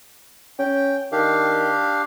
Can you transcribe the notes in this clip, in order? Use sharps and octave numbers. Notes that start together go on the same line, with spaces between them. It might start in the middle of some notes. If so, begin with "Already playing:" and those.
C#4 G5
D#3 D4 G4 F5